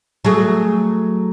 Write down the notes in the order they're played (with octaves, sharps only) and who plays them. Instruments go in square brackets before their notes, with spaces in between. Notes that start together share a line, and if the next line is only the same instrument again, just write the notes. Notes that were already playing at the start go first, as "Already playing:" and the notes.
[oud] F#3 A3 G#4